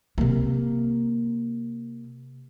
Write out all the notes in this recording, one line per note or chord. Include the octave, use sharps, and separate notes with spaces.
C3 A#3